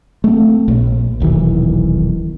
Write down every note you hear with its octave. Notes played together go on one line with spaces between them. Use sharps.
A3 C4
A#1
D#1 B1 D#3 E3